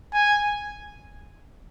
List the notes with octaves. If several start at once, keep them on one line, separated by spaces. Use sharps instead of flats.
G#5